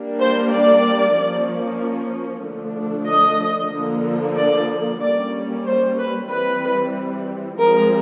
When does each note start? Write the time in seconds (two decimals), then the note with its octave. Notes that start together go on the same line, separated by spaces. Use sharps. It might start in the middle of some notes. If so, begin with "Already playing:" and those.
Already playing: G3 A#3 D4
0.20 C5
0.52 D5
1.16 F3 A#3 C#4
2.44 D3 F3 A3 D4
3.08 D#5
3.73 D3 F3 A#3
4.37 D5
5.01 G3 A#3 C#4 D5
5.66 C5
5.98 B4
6.30 E3 G3 C4 B4
7.58 F3 G#3 C4 A#4